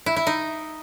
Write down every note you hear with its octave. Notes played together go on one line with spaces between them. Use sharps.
E4
E4
D#4